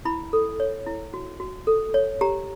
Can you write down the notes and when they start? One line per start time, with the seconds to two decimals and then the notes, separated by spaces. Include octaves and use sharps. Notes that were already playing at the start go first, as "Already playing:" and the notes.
0.05 E4 B5
0.33 A4
0.60 C#5
0.86 E4
1.14 F#4
1.40 F#4
1.67 A4
1.94 C#5
2.21 G4 A#5